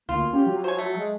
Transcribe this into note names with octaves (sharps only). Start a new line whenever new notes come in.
D2 A#3 F4
C#4 G4
F#3
C5 C#5 G#5
A3
G#3